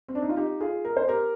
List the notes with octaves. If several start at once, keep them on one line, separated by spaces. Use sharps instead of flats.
C4
D4
D#4
F4
D#4 G4
F4 G#4
A#4
C5
G4 A#4